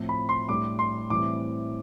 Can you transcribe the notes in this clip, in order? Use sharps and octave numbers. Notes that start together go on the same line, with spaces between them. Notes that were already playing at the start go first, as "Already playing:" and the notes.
Already playing: A2 F3 C4
B5
C6
A2 G3 D4 D6
C6
A2 E3 G3 C4 D6